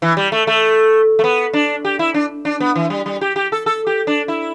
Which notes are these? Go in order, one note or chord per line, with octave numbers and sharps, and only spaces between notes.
E3
G3
A3
A3
A3
B3
D4
G4
E4
D4
D4
B3
E3
G3
G3
G4
G4
A4
A4
G4
D4
E4